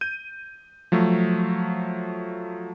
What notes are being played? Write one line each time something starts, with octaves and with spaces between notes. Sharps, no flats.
G6 D#7
F3 F#3 A3